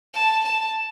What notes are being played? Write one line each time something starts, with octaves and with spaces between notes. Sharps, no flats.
A5
A5